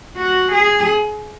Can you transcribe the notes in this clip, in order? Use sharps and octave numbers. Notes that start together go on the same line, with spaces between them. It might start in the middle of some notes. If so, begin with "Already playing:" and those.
F#4
G#4